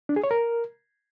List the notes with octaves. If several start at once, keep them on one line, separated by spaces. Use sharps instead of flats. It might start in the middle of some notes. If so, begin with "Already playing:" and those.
D4
G#4
C#5
A#4